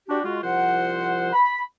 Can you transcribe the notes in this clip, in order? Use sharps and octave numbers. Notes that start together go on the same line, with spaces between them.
D4 F#4 G4
G#3 F4 F#4
C2 F3 F4 C5 F#5
B5